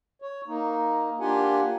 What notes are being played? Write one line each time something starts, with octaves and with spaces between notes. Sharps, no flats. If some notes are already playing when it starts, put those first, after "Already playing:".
C#5
A#3 D#4
A#3 D4 F4 G4 F#5 G#5